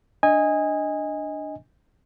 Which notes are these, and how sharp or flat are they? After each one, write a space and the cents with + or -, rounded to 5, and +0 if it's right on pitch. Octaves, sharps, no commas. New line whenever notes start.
D4 +5 D#5 +10 G#5 -20